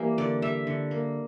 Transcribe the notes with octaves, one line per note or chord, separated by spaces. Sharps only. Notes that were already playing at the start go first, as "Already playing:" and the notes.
Already playing: E3 G3 A#3 G4
D3 D5
G3 E5
D3
A#3